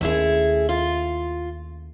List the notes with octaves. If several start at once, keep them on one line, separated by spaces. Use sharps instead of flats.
D#2 A3 C#4 E4 G#4
F4